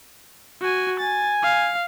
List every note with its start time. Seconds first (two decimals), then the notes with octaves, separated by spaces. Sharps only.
0.61 F#4 G#5
1.00 G#5 A6
1.43 F5